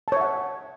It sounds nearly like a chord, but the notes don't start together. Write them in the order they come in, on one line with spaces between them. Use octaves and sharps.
A5 C#5 E5 F#5